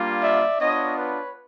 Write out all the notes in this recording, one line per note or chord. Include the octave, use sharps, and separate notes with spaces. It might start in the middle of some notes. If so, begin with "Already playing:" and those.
Already playing: G3 A#3 D4 F4
D5 E5
B3 D4 F4 C#5 D#5
B4 C#5